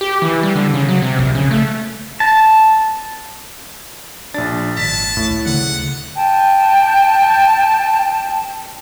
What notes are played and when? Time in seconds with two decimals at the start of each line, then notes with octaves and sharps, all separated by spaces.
0.01 G4
0.22 E3
0.43 G3
0.56 D3
0.74 C#3
0.89 F#3
1.02 C3
1.19 A#1
1.35 C#3
1.51 A3
2.20 A5
4.34 A#1 D4 A6
4.77 G#1 A5 B6
5.17 C#2 A2
5.46 D2 C#3 F#5
6.15 G5 A5